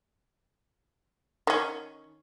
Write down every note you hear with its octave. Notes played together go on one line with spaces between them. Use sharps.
D#3 C#4